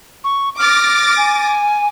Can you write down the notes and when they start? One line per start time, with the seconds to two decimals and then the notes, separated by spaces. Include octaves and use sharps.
0.24 C#6
0.58 D6 F6 A6 A#6
1.17 G#5